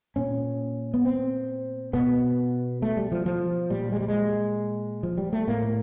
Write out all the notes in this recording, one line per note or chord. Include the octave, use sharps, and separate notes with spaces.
A#2 C#4
B3
C4
B2 B3
A3
G3
F3
F3
A#2 G3
G#3
G3
G#3
F3
G3
A3
A2 A#3